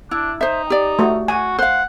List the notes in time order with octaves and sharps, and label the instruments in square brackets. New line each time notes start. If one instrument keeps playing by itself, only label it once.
[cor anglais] D4 [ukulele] E4
[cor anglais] D#4 [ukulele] C5 E5
[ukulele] G4 D5
[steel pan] A3 F#4
[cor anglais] F#4 [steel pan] G#5
[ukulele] C5 F5 [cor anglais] F#5